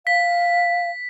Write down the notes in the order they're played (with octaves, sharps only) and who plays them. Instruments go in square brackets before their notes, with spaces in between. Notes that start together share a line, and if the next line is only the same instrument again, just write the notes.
[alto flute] F5 [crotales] B6